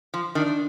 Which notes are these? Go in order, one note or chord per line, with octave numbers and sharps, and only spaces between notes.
F3
D#3 D4